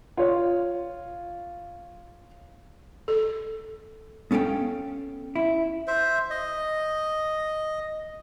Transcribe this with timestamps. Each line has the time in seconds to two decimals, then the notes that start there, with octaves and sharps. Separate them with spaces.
0.17 F4 C#5
3.08 A4
4.31 B3 C#4 A4 F5 G5
5.36 E4
5.87 C5 E5
6.30 D#5